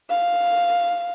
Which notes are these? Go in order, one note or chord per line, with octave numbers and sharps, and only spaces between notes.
F5